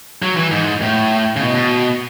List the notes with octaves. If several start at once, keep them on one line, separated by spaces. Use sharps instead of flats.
F#3
E3
G#2
A2
C#3
B2
B2